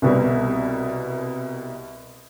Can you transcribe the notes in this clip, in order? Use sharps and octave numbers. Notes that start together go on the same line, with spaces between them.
C2 B2 G3